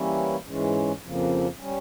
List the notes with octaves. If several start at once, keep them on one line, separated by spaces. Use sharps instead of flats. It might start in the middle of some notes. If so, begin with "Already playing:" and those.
Already playing: E3 G3 A#3 C#4 E4
G#2 E3 G#3 C#4
F2 C#3 F3 A#3
G3 C#4